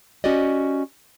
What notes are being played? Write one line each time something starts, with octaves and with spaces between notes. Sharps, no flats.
C#4 F#4 G4 D5 D#5